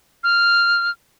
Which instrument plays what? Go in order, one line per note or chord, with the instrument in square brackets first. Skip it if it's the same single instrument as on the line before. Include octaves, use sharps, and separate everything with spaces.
[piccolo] F6